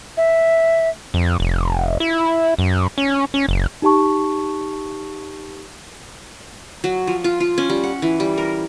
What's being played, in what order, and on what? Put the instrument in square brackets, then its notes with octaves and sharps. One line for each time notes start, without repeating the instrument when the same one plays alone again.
[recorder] E5
[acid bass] F2
F1
E4
F#2
C#4
C#4
F#1
[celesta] D#4 G4 A5 C#6
[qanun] F#3
F3
F4
F4
C#4
G3
F#5
E3
G3
A#4